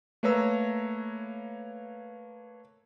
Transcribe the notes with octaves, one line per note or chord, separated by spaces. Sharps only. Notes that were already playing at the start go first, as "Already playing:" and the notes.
A3 A#3 B4 C#5 A#5 E6